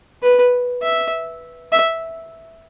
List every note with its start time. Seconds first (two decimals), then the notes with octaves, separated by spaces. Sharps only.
0.23 B4
0.82 E5
1.72 E5